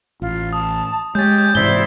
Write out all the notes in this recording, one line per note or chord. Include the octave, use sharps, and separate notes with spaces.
A1 F4
A5 D#6
G#3 G4 C#5 G#5 G6 A6
G6
G#2 C3 E3 E4 C5 D5 G7